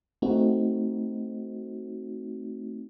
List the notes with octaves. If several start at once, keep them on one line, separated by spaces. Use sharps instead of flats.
A3 C4 D#4 F#4